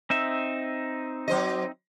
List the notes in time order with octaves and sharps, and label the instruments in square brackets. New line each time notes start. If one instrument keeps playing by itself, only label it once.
[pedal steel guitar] C4 D#4 E5
[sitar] F#3 C5 D#5